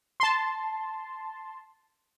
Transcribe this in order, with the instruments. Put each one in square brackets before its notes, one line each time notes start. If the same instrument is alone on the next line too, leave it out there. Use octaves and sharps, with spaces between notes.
[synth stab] A5 C6